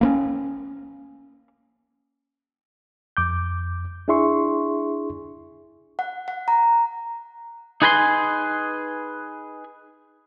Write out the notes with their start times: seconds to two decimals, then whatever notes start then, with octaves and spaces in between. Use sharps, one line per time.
0.01 A#3 B3 C#4
3.17 F2 D6 G6
4.08 D4 E4 G#4 E5 C6 C#6
5.99 F#5
6.28 F#5
6.48 A#5
7.82 D#4 G#4 B4 G#5 B5 C6